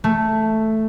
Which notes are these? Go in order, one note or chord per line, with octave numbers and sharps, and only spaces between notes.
A3